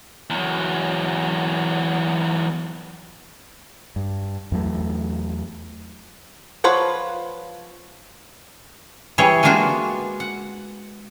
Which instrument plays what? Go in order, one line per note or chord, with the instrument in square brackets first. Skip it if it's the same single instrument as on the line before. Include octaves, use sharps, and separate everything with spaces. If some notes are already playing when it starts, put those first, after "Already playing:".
[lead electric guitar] E2 F#3
[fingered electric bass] G2
E2 F#3 A3
[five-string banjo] F3 F4 B4 C#5 F#5
[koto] E3 G3 G#4 C#5
G#3 A#3 B3 D4 F4 F#4
F#5